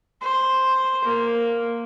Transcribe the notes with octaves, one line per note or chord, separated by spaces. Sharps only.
C5
A#3